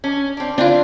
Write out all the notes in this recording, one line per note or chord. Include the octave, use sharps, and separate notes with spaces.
C#4
C4 D4
C4 D4 E4 F4